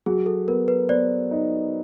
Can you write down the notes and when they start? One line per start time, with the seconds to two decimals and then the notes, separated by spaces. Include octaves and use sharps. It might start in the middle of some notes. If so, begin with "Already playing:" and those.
0.06 F#3 G#4
0.26 A4
0.47 B3 A#4
0.68 B4
0.89 B3 C5 D5
1.31 D#4